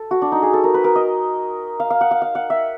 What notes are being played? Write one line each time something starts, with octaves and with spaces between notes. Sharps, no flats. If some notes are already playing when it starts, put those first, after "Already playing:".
Already playing: A4
F#4
D4
D#4
G#4
A4
A#4
B4
A#4
D#5
F5
F5
F#5
F5
F5
F#5
E5